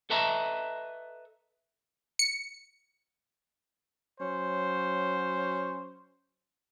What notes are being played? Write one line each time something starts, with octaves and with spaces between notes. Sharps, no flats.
A4 B4 D#5 E5 A5 A#5
C#7
F#3 C#4 C5